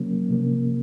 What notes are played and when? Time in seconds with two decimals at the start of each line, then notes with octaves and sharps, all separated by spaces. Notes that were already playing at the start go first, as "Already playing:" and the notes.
Already playing: C#3 F#3 A#3 C#4
0.31 C3 F3 A#3 C#4